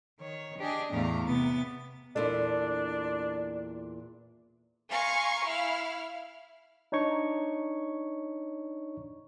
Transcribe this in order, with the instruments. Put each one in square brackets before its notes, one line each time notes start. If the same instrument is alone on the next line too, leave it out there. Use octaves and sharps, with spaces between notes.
[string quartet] D#3 C#5
D4 G4 G#4 D#5
E2 A2 A3 G4 F5 A#5
C3 B3 A6
[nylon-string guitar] E2 A#2 A4 [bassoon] D4
[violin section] F5 G#5 A#5 C6 C#6 C#7
E4 F5 F6
[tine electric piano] D4 D#4 C#5 C#6